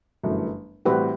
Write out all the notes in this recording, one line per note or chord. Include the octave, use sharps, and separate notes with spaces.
G1 F#2 E3 A3
A2 E3 G3 C4 F#4 G4 B4